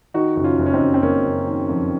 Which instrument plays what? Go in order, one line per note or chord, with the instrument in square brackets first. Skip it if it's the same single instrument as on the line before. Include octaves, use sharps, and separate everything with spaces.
[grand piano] D#3 D#4 F#4
F#1 F#4
C#4 F4
F#1
C#4
C4 D#4
F#1
C4
F#1 A#3 C#4
F#1
D#3
F2